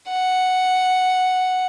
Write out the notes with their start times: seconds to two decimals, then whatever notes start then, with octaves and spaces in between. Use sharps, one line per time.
0.09 F#5